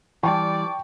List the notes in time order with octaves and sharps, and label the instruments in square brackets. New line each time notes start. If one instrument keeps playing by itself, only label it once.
[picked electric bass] E3 G3 [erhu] D5 [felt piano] G5 A5 C#6